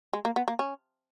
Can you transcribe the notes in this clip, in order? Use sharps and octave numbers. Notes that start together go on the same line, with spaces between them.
G#3
A#3
B3
A#3
C#4